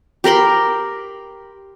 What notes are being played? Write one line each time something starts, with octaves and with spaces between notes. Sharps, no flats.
G4 A#4 B5 C6